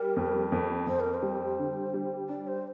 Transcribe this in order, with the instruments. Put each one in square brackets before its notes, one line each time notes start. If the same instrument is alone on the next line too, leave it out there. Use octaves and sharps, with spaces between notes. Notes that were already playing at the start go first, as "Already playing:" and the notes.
Already playing: [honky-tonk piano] G3 [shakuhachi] A#4
[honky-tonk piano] F2
F2
[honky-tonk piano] F2 [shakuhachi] C5
[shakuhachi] A#4
C5
[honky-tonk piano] G3
D3
G3
[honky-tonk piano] D4 [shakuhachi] D5
[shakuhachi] C5